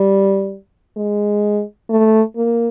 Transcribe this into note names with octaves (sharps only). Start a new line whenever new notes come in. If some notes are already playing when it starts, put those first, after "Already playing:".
Already playing: G3
G#3
A3
A#3